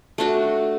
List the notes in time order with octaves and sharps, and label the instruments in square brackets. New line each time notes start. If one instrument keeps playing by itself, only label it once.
[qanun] A3 D4 F#4